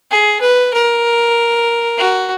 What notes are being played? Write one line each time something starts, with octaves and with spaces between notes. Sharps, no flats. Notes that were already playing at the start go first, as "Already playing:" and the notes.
G#4
B4
A#4
F#4